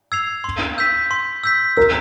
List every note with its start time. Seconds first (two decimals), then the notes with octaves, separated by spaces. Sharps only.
0.12 E6 G#6 C7 F7
0.44 C6
0.78 E6 G6 B6
1.11 C6
1.44 E6 G6 B6
1.77 A#4 E6